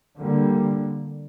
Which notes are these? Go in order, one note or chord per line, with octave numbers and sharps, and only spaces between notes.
D3 G3 A#3